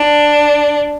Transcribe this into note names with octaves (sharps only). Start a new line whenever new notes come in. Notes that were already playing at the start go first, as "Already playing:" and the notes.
Already playing: D4